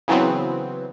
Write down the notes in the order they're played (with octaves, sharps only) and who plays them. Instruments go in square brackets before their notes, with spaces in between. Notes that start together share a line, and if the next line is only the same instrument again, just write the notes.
[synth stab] C#3 E3 F#3 B3 C4